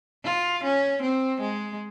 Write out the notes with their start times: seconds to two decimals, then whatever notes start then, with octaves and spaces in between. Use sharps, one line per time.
0.24 F4
0.64 C#4
1.02 C4
1.41 G#3